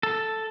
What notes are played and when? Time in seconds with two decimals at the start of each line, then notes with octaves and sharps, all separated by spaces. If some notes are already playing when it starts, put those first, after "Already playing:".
0.03 A4